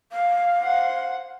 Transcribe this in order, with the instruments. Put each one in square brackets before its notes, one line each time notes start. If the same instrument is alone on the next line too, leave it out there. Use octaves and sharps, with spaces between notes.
[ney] F5
[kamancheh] C5 F#5